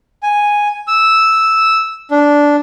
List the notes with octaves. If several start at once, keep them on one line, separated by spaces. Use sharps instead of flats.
G#5
E6
D4